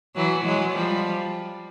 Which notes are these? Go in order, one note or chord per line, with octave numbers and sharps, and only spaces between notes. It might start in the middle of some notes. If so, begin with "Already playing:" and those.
E3 F#3
F#3 G#3
F3 G3